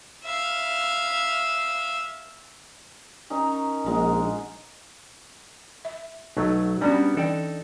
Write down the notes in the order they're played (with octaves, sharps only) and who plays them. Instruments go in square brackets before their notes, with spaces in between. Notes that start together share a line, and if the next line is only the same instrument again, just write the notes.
[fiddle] E5 F5
[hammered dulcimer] C#4 D#4 A#4
[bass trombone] A#1 [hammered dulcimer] G#3 A#4 F#5
[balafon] E5
[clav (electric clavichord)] B1 F#3 A3 [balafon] D#4
[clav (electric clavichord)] G3 B3 F#4 [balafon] C#4 D4 D5
[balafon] E3 G5 [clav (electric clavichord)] D#4 A4 D5